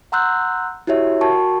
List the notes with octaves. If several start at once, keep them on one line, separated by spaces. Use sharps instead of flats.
F#5 A#5 C6 E6 F#6 G6
E4 F#4 G4 C#5 E5
F#4 A#4 G5 A5 C#6